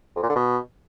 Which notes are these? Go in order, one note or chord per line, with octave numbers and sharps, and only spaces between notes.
F2
A#2
D3
B2